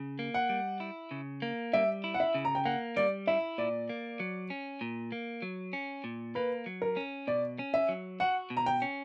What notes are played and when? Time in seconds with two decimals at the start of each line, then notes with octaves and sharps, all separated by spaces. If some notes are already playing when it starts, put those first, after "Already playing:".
Already playing: C#3
0.19 A#3
0.34 F#5
0.49 G3
0.80 E4
1.11 C#3
1.42 A#3
1.73 G3 E5
2.04 E4
2.14 F#5
2.20 E5
2.35 C#3
2.45 A#5
2.55 G5
2.65 A#3 F#5
2.96 G3 D5
3.27 E4 E5
3.58 A#2 D5
3.89 A#3
4.20 F#3
4.50 C#4
4.81 A#2
5.12 A#3
5.42 F#3
5.73 C#4
6.04 A#2
6.35 A#3 B4
6.66 F#3
6.82 A#4
6.97 C#4
7.27 B2 D5
7.59 C#4
7.74 E5
7.89 F#3
8.20 F#4 F#5
8.50 B2
8.57 A#5
8.66 G5
8.82 C#4